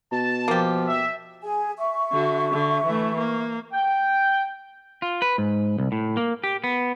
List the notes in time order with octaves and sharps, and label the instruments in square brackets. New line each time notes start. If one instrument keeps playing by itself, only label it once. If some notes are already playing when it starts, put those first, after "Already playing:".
[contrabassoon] B2 [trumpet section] A5
[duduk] F3 [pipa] A#3 G4
[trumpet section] E5
[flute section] G#4 G#5
E5 C#6
[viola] D3 F#4
D3
E3 A3
A#3
[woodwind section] G5
[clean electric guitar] F4
B4
G#2
C2
A2
A#3
G4
B3